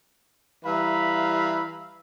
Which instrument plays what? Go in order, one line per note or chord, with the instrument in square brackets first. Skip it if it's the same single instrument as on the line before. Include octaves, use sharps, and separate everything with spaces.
[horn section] E3 G3 E5 F5 A#5 B5